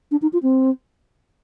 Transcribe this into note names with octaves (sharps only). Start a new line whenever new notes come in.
D4
D#4
F4
C4